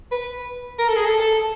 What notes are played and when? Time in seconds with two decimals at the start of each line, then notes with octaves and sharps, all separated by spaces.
0.12 B4
0.79 A#4
0.88 A4
0.97 G#4
1.05 A4
1.20 A4